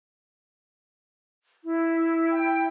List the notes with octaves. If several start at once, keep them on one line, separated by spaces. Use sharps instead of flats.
E4
G5